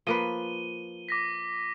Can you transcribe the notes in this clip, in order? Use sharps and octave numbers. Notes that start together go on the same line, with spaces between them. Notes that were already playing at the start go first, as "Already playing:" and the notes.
F3 A#3 B4 D#7 G7
D6 A#6 B6